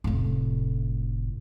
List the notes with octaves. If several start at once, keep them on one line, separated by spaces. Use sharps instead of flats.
F1 A2